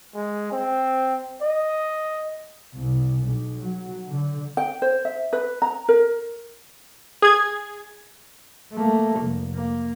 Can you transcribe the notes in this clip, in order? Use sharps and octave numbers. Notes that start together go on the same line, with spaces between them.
G#3
C4
D#5
C2
B1
F#3
D3
G5
C5
E5
B4
A#5
A#4
G#4 G#6
A3 A#3
F1
A#3